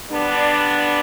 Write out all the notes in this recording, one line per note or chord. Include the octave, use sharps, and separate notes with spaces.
D3 G3 B3 D4